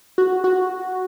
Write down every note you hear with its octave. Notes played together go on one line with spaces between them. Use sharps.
F#4
F#4